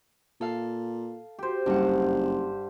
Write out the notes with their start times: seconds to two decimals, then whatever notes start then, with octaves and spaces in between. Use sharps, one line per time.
0.41 A#2 A4 F5
1.39 G4 C5
1.66 F#1 G2 F#5